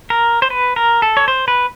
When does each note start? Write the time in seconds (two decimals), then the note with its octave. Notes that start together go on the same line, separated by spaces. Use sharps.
0.10 A#4
0.42 C5
0.50 B4
0.76 A#4
1.02 A4
1.17 C#5
1.28 C5
1.48 B4